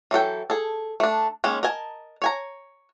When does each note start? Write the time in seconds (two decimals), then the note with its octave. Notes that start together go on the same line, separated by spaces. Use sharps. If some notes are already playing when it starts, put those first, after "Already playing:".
0.11 E3 F#3 A4 G5
0.50 G#4 A4
1.00 A3 D4
1.44 D#3 G#3 A#3 C#4
1.63 A#4 D#5 G#5 A5
2.22 C#5 G#5 A#5